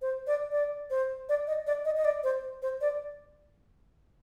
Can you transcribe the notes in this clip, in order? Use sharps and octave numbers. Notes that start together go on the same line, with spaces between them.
C5
D5
D5
C5
D5
D#5
D5
D#5
D#5
D5
C5
C5
D5